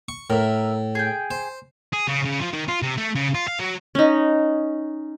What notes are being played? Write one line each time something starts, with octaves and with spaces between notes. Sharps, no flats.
C#6
A2 A#4 E5
G#4 G5
C5
G#4
C#3
C#3
F3
D#3
F4
C3
A3
C#3
F4
F5
F#3
C#4 D#4